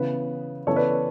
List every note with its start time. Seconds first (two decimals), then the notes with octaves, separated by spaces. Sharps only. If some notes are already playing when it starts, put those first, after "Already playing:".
Already playing: C#3 E3 B3 B4
0.67 C#3 E3 B3 A4 C#5
0.76 B4 D5